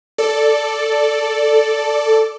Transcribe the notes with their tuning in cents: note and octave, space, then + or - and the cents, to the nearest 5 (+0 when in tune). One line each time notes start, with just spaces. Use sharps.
A4 +0 D5 +0